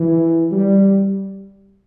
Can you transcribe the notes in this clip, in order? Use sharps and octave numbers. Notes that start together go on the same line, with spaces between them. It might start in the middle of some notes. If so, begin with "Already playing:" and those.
Already playing: E3
G3